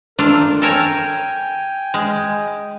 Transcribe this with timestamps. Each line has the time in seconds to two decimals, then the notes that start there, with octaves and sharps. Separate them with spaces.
0.19 A3 D4 F4 A#4
0.62 A4 A#4 C#5 G5 G#5
1.94 G#3